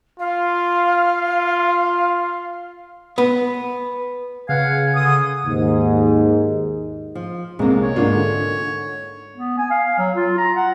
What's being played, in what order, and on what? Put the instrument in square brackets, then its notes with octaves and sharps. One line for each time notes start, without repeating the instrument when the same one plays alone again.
[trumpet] F4 [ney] F5
[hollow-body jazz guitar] B3
[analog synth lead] C#3 [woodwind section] B4 F5 F#5 [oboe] G#5
[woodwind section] D3 D#6
[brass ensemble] D#2 G#2
[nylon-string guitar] F3
[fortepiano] C2 C3 [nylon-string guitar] G#3 A#3
[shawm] C#5
[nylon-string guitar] G#2 [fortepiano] A#3 D4 F4
[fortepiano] D3
[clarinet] B3
G#5
F5
F#3
F4
A#5
F#5